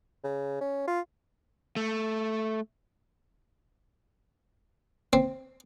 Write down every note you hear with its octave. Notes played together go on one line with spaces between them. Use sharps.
C#3
C#4
F4
A3
C4